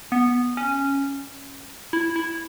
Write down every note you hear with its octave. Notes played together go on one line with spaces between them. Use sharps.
B3
C#4
E4
E4